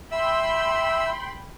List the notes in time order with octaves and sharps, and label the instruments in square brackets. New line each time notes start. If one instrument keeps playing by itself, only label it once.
[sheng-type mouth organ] E5 E6 [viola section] G5 B5 C6